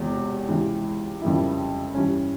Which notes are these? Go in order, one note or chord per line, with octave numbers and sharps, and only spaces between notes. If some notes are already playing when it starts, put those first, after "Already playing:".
Already playing: E1 E2 C3
C#2 C3 E3
F2 C#3 G3 A#3 E4
G2 E3 G3 C#4